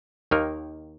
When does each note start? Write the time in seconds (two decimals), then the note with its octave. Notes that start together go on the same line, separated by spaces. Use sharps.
0.31 D#2 D#3 A#3 D#4 A#4